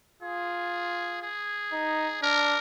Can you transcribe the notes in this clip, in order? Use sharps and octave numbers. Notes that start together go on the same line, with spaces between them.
F4 G#4
G#4
D#4
D4 A#4